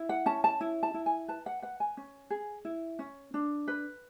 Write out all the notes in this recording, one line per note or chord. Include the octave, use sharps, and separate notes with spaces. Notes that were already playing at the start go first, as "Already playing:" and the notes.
Already playing: E4
F#5
C#4 A5
A5
E4
A5
E4
G#5
B4 A5
F#5
B4 F#5
G#5
C#4
G#4
E4
C#4
D4
B4